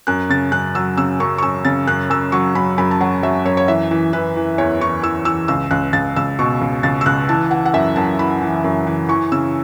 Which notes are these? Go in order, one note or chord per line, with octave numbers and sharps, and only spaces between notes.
F#2 F#6
C#3 A6
F#2 F#6
F#3 E6
C#3 E6
F#2 C#6
C#6
F#2 E6
C#3 A6
F#2 F#6
F#2 E6
F#3 C#6
F#2 B5
F#2 B5
A5
F#3 F#5
F#3 E5
F#2 C#5
C#5
E3 E5
E3
E3 B4
E3
E2 C#5
E3 C#6
E3 E6
E3 E6
C#2 E6
C#2 F#6
C#2 A6
C#2 E6
B2 C#6
C#2
C#2 A6
E6
C#2 F#6
E3 A5
E3 F#5
F#5
F#2 E5
F#2 A5
E3 B5
E3
F#2
E3
E3 C#6
C#3 E6